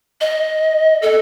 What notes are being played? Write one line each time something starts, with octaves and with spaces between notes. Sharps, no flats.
D#5
A4